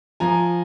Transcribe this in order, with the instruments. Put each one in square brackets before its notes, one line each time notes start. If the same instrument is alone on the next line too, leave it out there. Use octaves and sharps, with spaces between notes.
[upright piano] F3 G#5 A#5